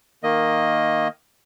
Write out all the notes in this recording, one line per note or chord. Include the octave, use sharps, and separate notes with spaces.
D#3 A#3 D#5